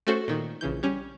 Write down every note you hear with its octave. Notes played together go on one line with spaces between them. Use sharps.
A3 C#4 F#4 A4 C5
A#2 D#3
A#1 C#3 E3 G6
G3 C#4